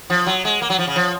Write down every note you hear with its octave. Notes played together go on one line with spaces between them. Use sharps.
F3
F#3
G#3
A#3
F#3
F3
C#3
F3